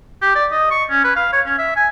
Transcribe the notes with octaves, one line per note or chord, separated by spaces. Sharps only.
G4
D5
D#5
C#6
C#4
B4
F5
C#5
C#4
E5
G#5